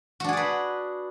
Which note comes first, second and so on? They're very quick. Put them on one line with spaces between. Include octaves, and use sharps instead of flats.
F#4 D4 G#4 D5 B4